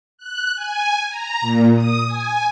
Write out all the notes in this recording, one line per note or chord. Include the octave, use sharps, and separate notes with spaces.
F#6
G#5
A#5
A#2
D#6
G#5